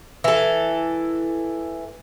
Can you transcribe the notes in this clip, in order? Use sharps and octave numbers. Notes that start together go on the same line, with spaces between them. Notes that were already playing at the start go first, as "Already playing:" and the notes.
E3 A4